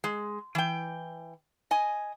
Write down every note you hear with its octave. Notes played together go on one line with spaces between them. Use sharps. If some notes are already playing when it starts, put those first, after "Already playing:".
G#3
E3 G5
D#5 G#5